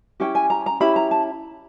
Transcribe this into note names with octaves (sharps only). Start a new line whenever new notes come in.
C#4 E4 G4 G5
G#5
A#5
A#5
C#4 E4 G4 B5
A#5
A5